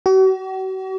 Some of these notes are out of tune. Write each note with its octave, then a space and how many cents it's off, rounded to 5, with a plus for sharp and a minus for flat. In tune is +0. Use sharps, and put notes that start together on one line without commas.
F#4 +40